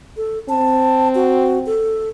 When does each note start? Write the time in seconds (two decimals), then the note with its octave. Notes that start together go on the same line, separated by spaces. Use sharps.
0.17 A4
0.49 C4 A5
1.15 F#4
1.66 A4